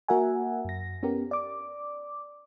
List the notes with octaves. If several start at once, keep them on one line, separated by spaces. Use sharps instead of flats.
A#3 F#4 A#4 E5 F#5 G#5
F#2 A#6
B3 C#4 G4 A#4
D5 D6